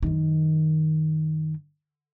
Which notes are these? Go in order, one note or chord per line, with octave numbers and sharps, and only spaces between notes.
F#2 D#3